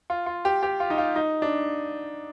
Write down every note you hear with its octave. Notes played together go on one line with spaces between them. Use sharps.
F4
F4
G4
G4
F4
D#4
F4
D#4
D4